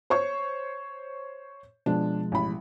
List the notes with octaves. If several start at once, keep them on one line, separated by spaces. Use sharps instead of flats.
C5 C#5 C#6
B2 F3 G#3 D4
A1 B5